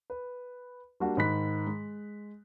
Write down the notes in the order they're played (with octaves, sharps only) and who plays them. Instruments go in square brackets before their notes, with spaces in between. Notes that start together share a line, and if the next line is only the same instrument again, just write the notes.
[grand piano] B4
G3 A#3 D4 F#4
G#2 D#3 D#4 B5 F#6 B6
G#3